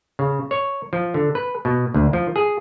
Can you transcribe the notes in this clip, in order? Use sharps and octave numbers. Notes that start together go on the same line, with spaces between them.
C#3
C#5
F3
D3
B4
B2
D2
F3
G#4